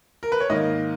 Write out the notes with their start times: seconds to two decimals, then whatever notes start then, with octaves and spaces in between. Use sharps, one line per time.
0.23 A#4
0.32 B4
0.40 C#5
0.50 G#2 D#3 A#3 D#5